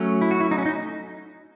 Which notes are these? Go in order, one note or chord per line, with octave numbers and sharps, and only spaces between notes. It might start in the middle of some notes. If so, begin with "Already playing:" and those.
Already playing: F#3 A3 C#4
E4
F#4
E4
D#4
C#4
D#4